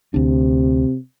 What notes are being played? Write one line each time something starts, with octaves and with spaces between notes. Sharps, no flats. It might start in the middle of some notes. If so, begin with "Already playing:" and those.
D2 C3 D4